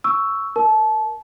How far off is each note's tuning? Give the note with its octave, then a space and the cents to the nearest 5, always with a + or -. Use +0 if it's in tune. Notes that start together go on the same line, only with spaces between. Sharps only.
C#6 +10 E6 +0
A#4 +5 A5 -25